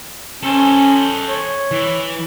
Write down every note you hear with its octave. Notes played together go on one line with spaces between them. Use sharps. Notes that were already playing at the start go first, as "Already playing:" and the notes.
C#4 A4 C5
C#5
E3